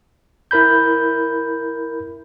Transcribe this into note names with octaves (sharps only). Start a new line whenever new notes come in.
E4 A#4 B5 G6